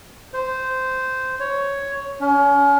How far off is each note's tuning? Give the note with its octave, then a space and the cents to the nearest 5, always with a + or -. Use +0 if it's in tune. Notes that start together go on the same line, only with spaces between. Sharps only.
C5 -10
C#5 +5
C#4 +35